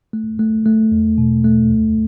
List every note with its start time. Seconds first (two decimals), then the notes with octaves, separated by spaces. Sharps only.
0.13 A3
0.39 A3
0.65 A3
0.92 E2
1.18 B2
1.44 A3
1.70 D2